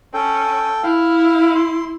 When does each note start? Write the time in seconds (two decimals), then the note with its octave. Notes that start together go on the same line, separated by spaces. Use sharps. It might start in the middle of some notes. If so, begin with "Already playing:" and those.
0.14 C#4 A4 G5
0.83 E4 F5
1.55 C6